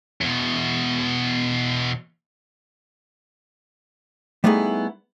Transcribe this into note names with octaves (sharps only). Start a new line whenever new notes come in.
E2 B2
G3 A3 B3 D#4 E4 G#4